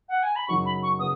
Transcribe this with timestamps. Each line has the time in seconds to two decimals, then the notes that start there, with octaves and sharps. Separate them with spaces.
0.09 F#5
0.23 G#5
0.36 B5
0.48 F#2 C#3 F#3 D#4 F#4 C#6
0.65 B5
0.83 C#6
0.99 C#3 B3 F#4 D#6